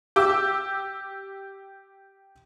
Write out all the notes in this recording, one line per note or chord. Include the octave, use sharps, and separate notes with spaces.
G4 D6 E6